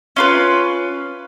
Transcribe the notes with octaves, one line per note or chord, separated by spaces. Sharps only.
C#4 F4 B4